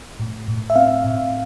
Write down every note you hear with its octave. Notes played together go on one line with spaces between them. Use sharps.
A2
A2
E5
C4 F5
A2